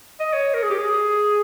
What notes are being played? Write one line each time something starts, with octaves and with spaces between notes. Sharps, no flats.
D#5
C#5
A#4
G#4
G4
G#4